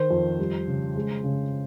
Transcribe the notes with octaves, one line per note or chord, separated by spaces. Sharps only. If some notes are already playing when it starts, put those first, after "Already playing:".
Already playing: D#3 C5
F2
G3
C#3
G#3
C#3